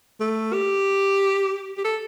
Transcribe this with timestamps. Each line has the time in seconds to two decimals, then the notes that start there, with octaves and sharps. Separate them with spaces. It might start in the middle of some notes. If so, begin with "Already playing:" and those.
0.20 A3
0.53 G4
1.78 G4
1.84 A4